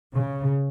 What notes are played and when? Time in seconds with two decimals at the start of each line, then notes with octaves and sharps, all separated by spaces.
0.15 C#3